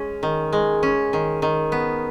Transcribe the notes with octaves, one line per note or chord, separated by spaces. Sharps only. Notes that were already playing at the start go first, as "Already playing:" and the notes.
Already playing: G#3 C#4
D#3
G#3
C#4
D#3
D#3
B3